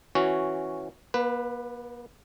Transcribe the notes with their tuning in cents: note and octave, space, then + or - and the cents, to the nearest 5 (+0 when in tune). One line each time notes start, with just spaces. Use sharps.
E3 +0 C#4 +0 F#4 +5
A#3 +45 B4 +0